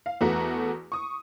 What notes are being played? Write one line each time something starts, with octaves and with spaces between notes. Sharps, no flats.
F5
E2 A3 B3 F#4 A#5
C#6 D#6